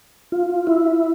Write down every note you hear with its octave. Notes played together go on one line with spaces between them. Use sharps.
F4
E4